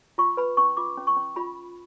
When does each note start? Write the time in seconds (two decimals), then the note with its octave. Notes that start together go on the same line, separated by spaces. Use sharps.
0.18 F4 C#6
0.37 B4 B5
0.57 C#4 C#6
0.77 F4 D6
0.97 C#4
1.07 C#6
1.16 C#4
1.36 F4 B5